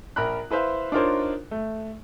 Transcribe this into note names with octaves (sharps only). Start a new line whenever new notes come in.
A#1 A#4 A#5 B5 F#6
E4 B4 C5 E5 F5
D4 D#4 F4 A#4 C5 C#5
A3